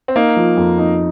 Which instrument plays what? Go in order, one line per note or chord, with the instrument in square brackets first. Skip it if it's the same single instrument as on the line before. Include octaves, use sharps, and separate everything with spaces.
[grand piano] C4
[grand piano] A#3 [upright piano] D#4
[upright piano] F3
F2
D#4